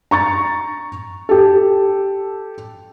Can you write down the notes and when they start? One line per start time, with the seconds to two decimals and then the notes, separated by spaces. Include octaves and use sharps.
0.11 A#5 C#6 A6
1.29 G4 A4